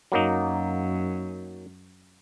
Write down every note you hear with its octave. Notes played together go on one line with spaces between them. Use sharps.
F#2 F#3 A#3 D#4